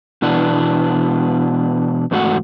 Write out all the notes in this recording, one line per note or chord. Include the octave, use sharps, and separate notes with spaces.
B2 E3 B3 D4
E2 G#2 A3 F4 F#4 F#5